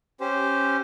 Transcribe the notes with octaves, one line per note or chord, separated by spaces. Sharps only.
C#4 G4 C5